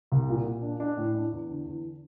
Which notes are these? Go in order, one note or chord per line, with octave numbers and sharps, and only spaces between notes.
C2
A#2
A#2
D4
D4
A2
D4
E2
D3
E2